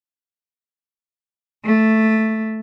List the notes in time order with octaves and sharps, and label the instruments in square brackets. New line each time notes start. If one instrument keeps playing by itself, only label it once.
[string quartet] A3